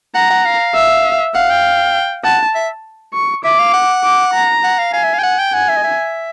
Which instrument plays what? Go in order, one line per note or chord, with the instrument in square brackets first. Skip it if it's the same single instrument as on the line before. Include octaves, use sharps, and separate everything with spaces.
[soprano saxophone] F#5 [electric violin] A#5
[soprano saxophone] F#5
F5
[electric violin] E5
[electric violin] F5 [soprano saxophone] F#5
[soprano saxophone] G5
[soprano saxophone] F#5 [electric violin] A5
[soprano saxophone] E5
[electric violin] C#6
[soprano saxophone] E5 [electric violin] D6
[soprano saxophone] F5
F#5
[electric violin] D6
A#5
[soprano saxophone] F#5
F5
[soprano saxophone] F5 [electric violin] G#5
[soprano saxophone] E5
F5
G5
F#5
G5
[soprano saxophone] F#5 [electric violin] G#5
[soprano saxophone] E5
D#5
E5